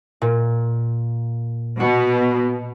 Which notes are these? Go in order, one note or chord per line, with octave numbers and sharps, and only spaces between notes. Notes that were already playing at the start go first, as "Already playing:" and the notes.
A#2
B2 F#4 C#7